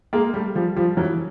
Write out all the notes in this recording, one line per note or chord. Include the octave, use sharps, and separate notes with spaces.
G#3 A#3
G3 A3
F3 G3
F3 G3
E3 F#3